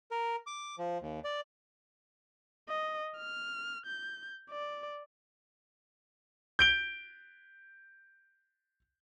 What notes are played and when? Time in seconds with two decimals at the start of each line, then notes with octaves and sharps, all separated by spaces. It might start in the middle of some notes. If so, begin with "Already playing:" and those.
0.11 A#4
0.47 D6
0.78 F3
1.02 D#2
1.24 D5
2.69 D#5
3.17 F6
3.86 G6
4.51 D5
6.59 G6 D7 G7